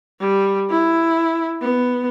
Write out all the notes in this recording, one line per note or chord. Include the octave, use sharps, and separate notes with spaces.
G3
E4
B3